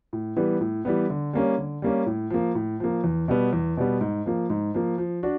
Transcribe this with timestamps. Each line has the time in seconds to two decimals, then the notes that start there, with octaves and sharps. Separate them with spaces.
0.13 A2
0.36 E3 G3 B3
0.61 A2
0.85 E3 G3 B3
1.10 D3
1.33 G3 A#3 C#4
1.58 D3
1.82 G3 A#3 C#4
2.06 A2
2.30 F3 A#3
2.55 A2
2.80 F3 A#3
3.04 E2
3.28 B2 G3 B3
3.53 E2
3.77 B2 G3 B3
4.01 G#2
4.26 F3 A#3
4.50 G#2
4.74 F3 A#3
4.98 F3
5.23 D4 F#4